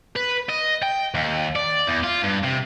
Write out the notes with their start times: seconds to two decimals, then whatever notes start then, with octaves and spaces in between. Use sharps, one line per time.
0.16 B4
0.49 D#5
0.82 G5
1.14 D#2
1.56 D5
1.87 E2
2.03 F4
2.23 G2
2.43 C3